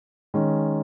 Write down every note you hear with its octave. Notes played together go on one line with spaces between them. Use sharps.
D#3 G#3 C#4